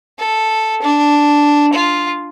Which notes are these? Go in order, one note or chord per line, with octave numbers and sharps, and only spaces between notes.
A4
D4
F4